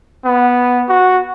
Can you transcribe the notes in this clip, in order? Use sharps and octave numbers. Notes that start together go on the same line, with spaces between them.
B3
F#4